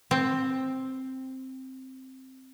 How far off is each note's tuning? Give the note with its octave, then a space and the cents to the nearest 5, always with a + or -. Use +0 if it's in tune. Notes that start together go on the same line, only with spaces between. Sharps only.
C4 +5